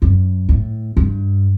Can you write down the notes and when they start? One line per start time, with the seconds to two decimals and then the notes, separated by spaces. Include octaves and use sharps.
0.02 F#2
0.49 A2
0.97 G2